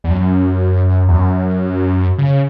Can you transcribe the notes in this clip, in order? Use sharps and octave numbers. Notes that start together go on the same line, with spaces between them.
E2
F#2
E2
F#2
C#3